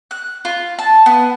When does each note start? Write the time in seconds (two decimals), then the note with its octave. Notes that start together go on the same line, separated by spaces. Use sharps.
0.11 F#6
0.45 F4
0.79 A5
1.06 B3